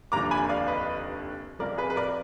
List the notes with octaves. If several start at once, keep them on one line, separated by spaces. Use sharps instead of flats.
F1 D#2 D3 F3 A#5 D6
G#5 B5
D5 F5
B4 D#5
F1 F2 F3 A#4 D5
G#4 B4
B4
A#4 D5